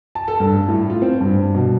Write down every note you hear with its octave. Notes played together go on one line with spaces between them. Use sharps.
A5
A4
G2
A2
F4
C4
G2
B2